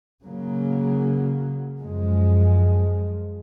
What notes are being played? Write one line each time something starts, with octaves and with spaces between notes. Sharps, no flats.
C#3 F#3 A#3
F#2 F3 G#3